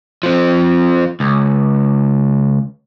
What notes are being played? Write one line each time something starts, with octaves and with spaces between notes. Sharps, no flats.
F3 C4
C#2